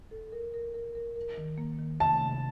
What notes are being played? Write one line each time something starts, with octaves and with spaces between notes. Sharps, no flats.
A4
A#4
A#4
A#4
A#4
A#4
D#3
A#3
D#3
C3 A5
C3